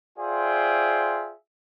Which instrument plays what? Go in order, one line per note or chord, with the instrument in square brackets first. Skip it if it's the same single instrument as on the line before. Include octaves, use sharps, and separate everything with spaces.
[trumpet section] F4 G#4 C5 D5 E5 G5